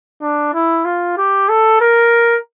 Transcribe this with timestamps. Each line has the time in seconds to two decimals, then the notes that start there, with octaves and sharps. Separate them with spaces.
0.22 D4
0.54 E4
0.85 F4
1.18 G4
1.49 A4
1.81 A#4